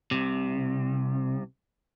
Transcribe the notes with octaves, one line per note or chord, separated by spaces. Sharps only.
C2 C3